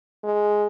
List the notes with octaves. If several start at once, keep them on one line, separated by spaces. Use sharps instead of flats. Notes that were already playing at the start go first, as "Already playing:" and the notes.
G#3